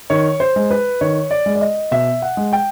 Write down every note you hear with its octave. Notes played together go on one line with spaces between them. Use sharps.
D#3 C#5
C5
G#3
B4
D#3 C#5
D5
G#3
D5
D#5
B2 E5
F#5
G#3
G5